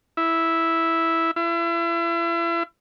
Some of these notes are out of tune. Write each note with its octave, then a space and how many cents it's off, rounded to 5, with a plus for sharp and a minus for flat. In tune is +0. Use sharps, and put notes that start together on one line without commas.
E4 -5
E4 +35